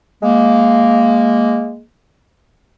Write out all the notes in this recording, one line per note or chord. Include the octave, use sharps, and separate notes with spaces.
G#3 A#3